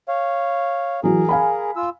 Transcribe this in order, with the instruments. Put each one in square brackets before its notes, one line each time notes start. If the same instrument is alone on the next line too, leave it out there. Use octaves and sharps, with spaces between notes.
[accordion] C#5 F5
[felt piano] E3 F#3 [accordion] G#4 A#4
[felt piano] F5 G#5 B5
[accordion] F4 E6